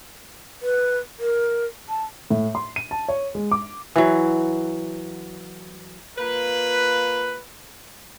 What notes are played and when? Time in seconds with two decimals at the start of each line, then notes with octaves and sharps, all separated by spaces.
0.62 B4
1.19 A#4
1.89 A5
2.30 A2
2.55 C6
2.76 D#7
2.91 A5
3.08 C#5
3.35 G#3
3.51 D6
3.96 E3 F#3
6.18 A#3 F4 B4